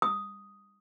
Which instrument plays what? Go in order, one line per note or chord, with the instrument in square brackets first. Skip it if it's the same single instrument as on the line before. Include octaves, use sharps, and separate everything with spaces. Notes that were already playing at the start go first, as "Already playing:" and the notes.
[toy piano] D#6